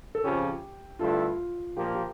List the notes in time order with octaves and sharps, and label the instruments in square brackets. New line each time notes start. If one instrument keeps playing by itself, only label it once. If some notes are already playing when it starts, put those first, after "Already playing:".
[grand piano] A4
[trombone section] F2 C#3 F3 C#4 [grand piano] G4
[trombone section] G2 D3 A3 E4 A4 [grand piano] F4
[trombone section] A#2 F3 A#3 [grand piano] G4
[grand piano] G4